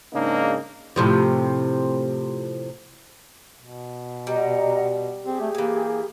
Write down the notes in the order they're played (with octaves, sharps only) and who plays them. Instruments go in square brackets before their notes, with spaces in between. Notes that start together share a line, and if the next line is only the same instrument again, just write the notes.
[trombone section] G#2 C#3 A#3 D4 D#4
[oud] A2 C3 F3
[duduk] B2
[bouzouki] G3 [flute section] D#5 F#5 A#5
[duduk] C4 [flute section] G4 G#4
[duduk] A3
[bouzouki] E3 G#5 [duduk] A#3